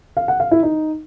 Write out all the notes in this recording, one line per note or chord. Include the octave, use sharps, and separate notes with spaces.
F5
F#5
F5
E4
D#4